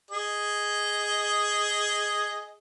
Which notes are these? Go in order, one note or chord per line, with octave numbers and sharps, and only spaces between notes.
G#4 D#5